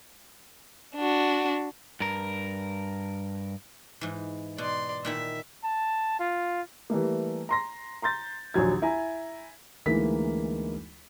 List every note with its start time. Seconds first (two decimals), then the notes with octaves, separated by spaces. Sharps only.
0.96 D4 F#4
2.00 G2 A#4
4.01 G#2 E3
4.58 B2 D5 C6
5.05 A#2 D#3 E4 E5
5.64 A5
6.19 F4
6.90 E3 G3 A3 A#3
7.49 A#5 C6 A#6
8.02 A#5 C6 G6 A6
8.54 A#1 D#2 F#3 G#6
8.82 E4 G#5 A#5
9.86 D2 E3 G#3 A#3 D#4 B6